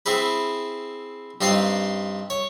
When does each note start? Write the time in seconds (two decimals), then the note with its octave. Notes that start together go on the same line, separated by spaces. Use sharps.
0.06 C4 E4 G#4 B4
1.41 G2 C4 D#4 F4 C6
2.30 C#5